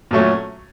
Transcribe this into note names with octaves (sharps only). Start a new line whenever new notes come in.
A#2 F#3 A3 C#4